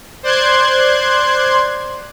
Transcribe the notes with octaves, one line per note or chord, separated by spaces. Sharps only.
C5 D5 C6 F#6 G#6